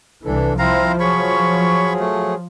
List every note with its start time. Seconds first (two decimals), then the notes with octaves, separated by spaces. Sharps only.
0.25 C2 E3 D4 A4
0.59 F3 C4 E4 C5 F5 A#5
1.00 F#3 G#4 C#5 B5 C#6
2.00 A3